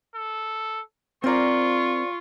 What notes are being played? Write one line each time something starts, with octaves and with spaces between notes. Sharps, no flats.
A4
C4 F4 A#4 C5 D5 A#5 C#6